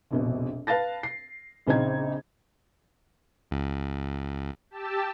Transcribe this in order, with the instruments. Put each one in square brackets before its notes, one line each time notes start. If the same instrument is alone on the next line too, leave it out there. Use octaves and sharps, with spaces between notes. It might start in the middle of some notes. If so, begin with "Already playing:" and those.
[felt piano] F1 A#1 B2
B4 F5 A5 A6 A#6
C7
A#1 C#3 C4 D#4 G#6
[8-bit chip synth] C#2
[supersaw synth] G4 A5 E6